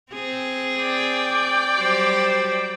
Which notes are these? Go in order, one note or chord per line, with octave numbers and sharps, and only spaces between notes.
C4 G#4
D5 G5
F#3 G3 C5